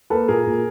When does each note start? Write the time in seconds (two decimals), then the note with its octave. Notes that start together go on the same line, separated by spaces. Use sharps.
0.10 A#3 A4 B4
0.28 A#2 G#4 A#4
0.47 A#2